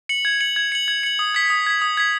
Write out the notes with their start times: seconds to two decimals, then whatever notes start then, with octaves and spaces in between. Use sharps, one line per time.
0.09 C#7 F#7
0.25 G#6
0.41 C#7 F#7
0.56 G#6
0.72 C#7 F#7
0.88 G#6
1.03 C#7 F#7
1.19 D#6
1.35 G#6 B6
1.50 D#6
1.67 G#6 B6
1.82 D#6
1.97 G#6 B6